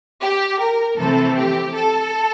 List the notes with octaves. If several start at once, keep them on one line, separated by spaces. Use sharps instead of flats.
G4
A#4
C3 E3 A3 C4 A4
G4
A4